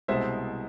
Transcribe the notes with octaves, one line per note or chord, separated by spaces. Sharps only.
C2 B2 G#3 C5 E5